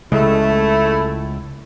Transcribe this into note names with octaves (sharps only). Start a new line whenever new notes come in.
C#2 C#3 G#3 A3 E4